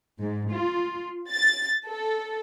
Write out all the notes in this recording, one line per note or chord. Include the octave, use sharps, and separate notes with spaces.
G#2
F4
A6
A4